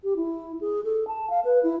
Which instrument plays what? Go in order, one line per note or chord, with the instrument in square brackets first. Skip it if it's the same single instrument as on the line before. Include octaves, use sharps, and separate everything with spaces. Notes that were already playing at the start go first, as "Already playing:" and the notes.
[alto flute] G4
E4
G#4
A4
A5
F5
B4
E4